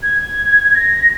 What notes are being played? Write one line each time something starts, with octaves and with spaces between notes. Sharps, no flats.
G#6
A#6